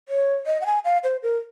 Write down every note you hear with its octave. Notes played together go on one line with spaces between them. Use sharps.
C#5
D#5
F#5
G#5
F5
C5
A#4